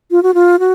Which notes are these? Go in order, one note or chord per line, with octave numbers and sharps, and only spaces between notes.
F4
F#4
F4
F#4